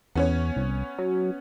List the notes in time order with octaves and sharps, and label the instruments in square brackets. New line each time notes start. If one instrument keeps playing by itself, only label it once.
[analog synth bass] E2 [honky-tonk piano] B3 C#4 C#5
[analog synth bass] C2
F#3